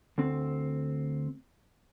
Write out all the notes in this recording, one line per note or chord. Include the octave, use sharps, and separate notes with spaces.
D2 C4